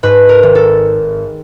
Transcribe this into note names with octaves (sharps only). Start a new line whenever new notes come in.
G#2 B4
A#4
G#1
A4